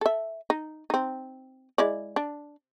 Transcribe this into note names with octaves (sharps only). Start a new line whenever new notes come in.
A4 E5
D#4
C4 D#4
G#3 E4 D5
D4